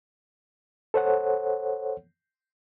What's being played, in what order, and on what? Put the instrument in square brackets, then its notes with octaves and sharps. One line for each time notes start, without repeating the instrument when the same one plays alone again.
[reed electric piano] A4 C5 C#5 F#5